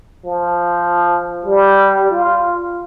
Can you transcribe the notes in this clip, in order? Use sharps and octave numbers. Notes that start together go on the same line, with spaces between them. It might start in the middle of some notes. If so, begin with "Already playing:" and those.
F3
G3
F4